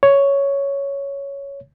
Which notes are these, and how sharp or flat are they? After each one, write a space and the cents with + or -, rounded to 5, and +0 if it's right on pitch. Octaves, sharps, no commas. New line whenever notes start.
C#5 +5